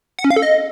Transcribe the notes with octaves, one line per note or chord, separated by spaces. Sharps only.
F#5
C#4
F5
A4
D#5